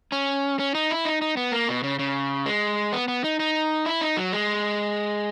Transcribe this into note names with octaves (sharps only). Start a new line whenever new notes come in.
C#4
C#4
D#4
E4
D#4
D#4
B3
A#3
B2
C#3
C#3
G#3
B3
B3
D#4
D#4
E4
D#4
F#3
G#3